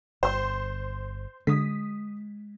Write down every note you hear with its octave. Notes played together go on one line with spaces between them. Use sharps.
G1 C5 G5 C6
D3 G#3 D#6 B6